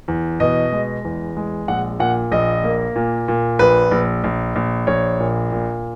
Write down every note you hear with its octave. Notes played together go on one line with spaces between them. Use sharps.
E2
B2 D#5
G#3
E2
G#3
A#1 F#5
A#2 F#5
A#1 D#5
A#3
A#2
A#2
A#1 B4
A#1
A#1
A#1
A#1 C#5
A#2
A#2